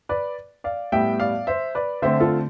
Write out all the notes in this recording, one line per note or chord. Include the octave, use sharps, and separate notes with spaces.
B4 D5
D5 F5
A2 G3 B3 E5 G5
D5 F5
C5 E5
B4 D5
D3 A3 C4 C5 E5
F4 A4